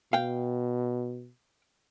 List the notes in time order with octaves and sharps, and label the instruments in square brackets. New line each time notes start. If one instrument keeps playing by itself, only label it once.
[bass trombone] B2 [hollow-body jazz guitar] F5 G5